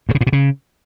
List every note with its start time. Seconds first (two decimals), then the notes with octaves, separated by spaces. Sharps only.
0.09 G2
0.15 C#3
0.21 A2
0.27 B2
0.33 C#3